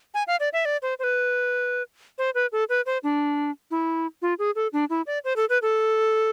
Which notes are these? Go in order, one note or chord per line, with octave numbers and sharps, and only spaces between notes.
G#5
F5
D5
E5
D5
C5
C5
B4
C5
B4
A4
B4
C5
D4
E4
F4
G#4
A4
D4
E4
D5
C5
A4
B4
A4